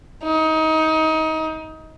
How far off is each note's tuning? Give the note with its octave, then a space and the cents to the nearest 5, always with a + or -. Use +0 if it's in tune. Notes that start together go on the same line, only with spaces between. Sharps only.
D#4 +25